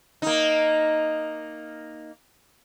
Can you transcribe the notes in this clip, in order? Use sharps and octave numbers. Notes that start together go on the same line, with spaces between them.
A#3 D#4